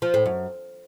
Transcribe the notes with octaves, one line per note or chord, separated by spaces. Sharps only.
F3
A2
F#2